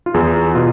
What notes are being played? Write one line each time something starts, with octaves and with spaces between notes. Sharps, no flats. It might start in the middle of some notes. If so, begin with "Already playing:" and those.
F4
E2 G#4
B2 F4